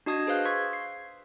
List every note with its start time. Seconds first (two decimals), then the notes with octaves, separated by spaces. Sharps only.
0.06 D4 F#4 D#5 A5 D#6 G#6
0.27 G#4 B4 C5 F5 F#6 G6
0.46 C6 C#6 E6 G#6 B6
0.73 C7